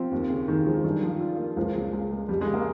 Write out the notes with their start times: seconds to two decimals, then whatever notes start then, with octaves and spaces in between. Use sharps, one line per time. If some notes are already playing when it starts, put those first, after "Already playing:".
Already playing: F3 C4
0.11 D#2
0.30 C#3
0.48 D#2 D#3
0.66 F3 G#3
0.84 G2 D#3
1.03 F3
1.21 F4
1.38 A#3
1.57 C#2 F3
1.75 C#3
1.93 C#2
2.11 G#3
2.29 F2 G3
2.41 G#3
2.47 C#3
2.54 A#3